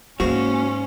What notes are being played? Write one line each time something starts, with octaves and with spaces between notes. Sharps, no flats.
G#2 G#3 A#3 B3 C#4 F#4 F5